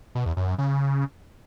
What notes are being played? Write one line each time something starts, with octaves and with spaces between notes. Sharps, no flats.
B2
E2
F#2
F#2
C#3